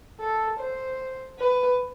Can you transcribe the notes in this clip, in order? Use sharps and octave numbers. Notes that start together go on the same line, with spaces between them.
A4
C5
B4